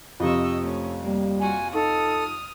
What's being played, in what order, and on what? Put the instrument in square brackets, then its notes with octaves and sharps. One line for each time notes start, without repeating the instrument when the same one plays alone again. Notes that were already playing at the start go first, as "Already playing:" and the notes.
[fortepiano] F2 C3 [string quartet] D#5 C#6 E6
[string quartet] A3 C#4
[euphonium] G3 [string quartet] A#3
[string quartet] F4 F#4 [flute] G#5
[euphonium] D#4 [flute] A4 [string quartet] D#6 F6